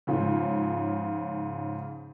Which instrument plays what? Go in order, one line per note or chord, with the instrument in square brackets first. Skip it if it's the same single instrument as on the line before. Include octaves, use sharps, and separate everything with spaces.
[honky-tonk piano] G#2 C#3 F3